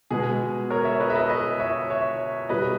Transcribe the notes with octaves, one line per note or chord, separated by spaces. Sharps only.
B2 G#3 B3 G#4
A#4 C#5
C#5 E5
B4 D#5
E5
B4 D#5
B4 D#5
C#5 E5
C#5 E5
B2 G3 B3 B4 D#5